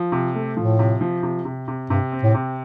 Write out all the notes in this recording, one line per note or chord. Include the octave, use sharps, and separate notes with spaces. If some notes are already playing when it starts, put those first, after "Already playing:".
Already playing: F3
C3
A3
A2 F3
C3
F3
C3
C3
C3
G2 C3
C4
A2
C3